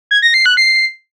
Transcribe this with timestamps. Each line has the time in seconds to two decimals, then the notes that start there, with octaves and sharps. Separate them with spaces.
0.11 G#6
0.22 A#6
0.34 C7
0.46 F#6
0.57 C7